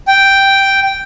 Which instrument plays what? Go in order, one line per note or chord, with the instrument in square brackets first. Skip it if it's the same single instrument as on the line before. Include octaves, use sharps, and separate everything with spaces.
[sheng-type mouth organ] G5